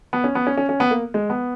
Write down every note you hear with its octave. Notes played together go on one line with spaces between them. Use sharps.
B3
C#4
B3
C#4
C#4
C#4
B3
A#3
G#3
B3